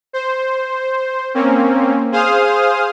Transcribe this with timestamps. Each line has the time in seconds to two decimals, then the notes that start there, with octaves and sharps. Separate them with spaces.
0.13 C5
1.34 A#3 C4 C#4
2.12 G#4 C5 F5 D#6 F6